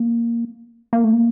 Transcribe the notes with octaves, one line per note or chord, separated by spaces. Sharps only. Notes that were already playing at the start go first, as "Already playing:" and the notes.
Already playing: A#3
A#3
A3
A#3